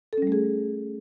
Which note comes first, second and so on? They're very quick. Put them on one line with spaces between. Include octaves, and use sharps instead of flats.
A4 C#4 G3 A3 G#4